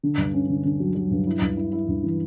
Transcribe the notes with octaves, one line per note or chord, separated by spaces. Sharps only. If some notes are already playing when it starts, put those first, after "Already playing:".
D3
G2
C#4
D3
D3
F#3
F#3
G2
E4
G2
E4
E4
G2
E3